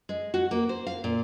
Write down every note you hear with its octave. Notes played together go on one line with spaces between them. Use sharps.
G#3
F#4
A#3
C5
F5
A#2